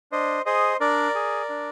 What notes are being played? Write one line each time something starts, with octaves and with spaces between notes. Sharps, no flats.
D4 C5 D#5
G#4 C5 D#5
D4 A#4 D5
G#4
D4